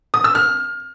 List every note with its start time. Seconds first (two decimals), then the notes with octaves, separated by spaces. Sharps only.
0.14 D#6
0.24 E6
0.35 F6